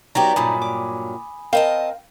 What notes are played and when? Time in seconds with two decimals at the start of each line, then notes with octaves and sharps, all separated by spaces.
0.15 F#3 B3 D#4 G4 D5 G5 A#5
0.36 G2 A#2 F#3 G#5 B5 D#6
0.62 D6
1.53 C4 A#4 D#5 F5 G5 A5